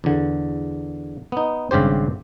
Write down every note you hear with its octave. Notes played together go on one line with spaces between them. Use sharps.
E2 D3
B3 D#4
G#1 G2 C#3 G4 C5